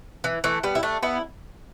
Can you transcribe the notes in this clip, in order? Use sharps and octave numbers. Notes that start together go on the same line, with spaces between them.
E3
E3 A3
G3 B3
E4
A3 D4
B3 E4